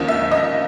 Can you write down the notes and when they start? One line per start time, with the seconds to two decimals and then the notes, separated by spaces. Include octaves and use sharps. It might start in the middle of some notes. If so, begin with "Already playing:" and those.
Already playing: D#2 D3 F3 A#3 C#4 D#5
0.08 E5
0.31 D#5